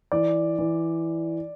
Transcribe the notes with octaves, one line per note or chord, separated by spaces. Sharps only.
E3 D5
E3